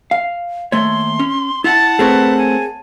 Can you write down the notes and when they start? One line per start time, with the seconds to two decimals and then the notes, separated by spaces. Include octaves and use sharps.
0.11 F5
0.72 D#2 A3 C#5 C6
1.19 C#4
1.64 E4 F#5 A5 A6
1.99 A3 C4 G#4 A#4 B4 C#5
2.37 G#5